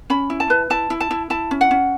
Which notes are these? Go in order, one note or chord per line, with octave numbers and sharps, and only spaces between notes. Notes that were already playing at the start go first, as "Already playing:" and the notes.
C#4 B5
E4
A5
B4
E4 A5
E4
A5
E4
E4 A5
C#4
F#5
C#4